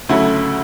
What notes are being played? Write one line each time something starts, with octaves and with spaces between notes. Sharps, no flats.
D2 C#3 F#3 A3 E4